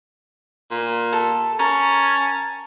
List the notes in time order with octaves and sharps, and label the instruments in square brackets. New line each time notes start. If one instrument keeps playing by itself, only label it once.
[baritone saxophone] A#2
[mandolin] A4
[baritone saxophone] C#4 [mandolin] A#4 [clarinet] A5